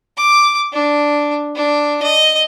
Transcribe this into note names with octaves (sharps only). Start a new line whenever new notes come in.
D6
D4
D4
D#5